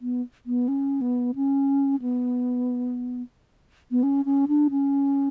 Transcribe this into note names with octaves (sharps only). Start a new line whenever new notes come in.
B3
B3
C#4
B3
C#4
B3
B3
C#4
C#4
D4
C#4